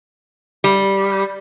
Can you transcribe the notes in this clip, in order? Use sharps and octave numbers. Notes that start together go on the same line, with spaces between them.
G3